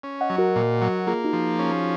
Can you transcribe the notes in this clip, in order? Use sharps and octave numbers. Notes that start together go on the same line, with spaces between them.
C#4
D#5 F#5
F#3
F#4 A#4
A#2
F#3
A#3 F4 G#4
D#4 F#4
F3
C#4